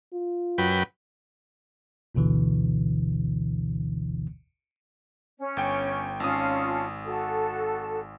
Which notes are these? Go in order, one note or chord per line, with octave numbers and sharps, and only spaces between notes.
F4
F#2 B4 G5
G1 D2 B2 D3 E3
C#4
G1 G5
G#1 C#4 F4 A5 D#6
F#4 A4 A5